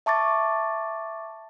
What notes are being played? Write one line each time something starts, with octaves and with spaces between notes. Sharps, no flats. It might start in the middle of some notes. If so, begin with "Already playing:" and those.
E5 A5 C#6 D6 A6